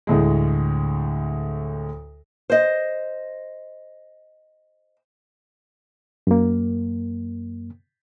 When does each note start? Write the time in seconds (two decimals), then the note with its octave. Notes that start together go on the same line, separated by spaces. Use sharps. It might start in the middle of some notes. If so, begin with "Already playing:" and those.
0.07 D2 A2 G#3
2.50 C5 D#5
6.27 F#2 A#3